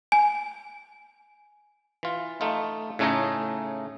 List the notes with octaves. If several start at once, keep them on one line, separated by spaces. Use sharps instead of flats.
G#5
E3 F4
A3 D#4 F4
A2 C#3 A3 D#4 G#4 D#5